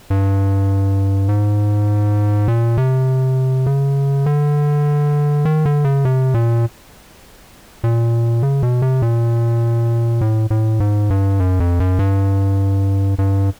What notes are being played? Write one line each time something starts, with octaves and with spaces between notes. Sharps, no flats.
G2
G#2
A#2
C3
C#3
D3
D#3
D3
C#3
C3
A#2
A#2
C#3
B2
C3
A#2
A2
A2
G#2
G2
F#2
F2
F#2
G2
G2